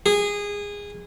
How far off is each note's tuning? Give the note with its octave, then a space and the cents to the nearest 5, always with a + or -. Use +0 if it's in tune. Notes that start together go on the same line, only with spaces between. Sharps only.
G#4 -20